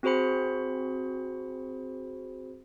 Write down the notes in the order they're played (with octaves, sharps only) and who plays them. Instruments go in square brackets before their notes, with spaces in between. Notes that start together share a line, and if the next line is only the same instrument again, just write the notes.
[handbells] C4 F#4 G#4 C5 B5 C#7